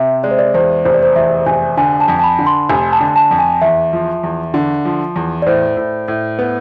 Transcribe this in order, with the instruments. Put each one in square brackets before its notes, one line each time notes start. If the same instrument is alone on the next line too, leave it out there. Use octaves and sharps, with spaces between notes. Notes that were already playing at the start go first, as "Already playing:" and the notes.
Already playing: [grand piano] C3 [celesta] E5
[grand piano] G#3 [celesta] D5
[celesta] C5
D5
[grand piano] E2 [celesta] C5
[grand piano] F1 [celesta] C5
[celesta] D5
C5
[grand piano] E2 [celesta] E5
[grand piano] F1 [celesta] G#5
[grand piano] D3 [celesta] G#5
[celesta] A5
[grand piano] F2
[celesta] A5
B5
[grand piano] D3
[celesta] C6
[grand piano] F1 [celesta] G#5
[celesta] A5
[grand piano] D3
[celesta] A5
[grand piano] F2
[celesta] G#5
[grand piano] E2 [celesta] E5
[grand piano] F3
E2
D3
F3
E2
[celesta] D5
[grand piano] A2 [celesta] C5
[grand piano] A2
A2
B3